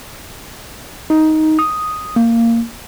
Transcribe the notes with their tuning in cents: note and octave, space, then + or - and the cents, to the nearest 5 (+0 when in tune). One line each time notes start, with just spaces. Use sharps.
D#4 +10
D#6 +0
A#3 -15